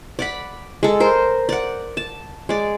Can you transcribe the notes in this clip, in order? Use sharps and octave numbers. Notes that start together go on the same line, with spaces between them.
D5 F#5 B5
G#3 A4
A#4 C5
D5 F#5
A5
G#3 D5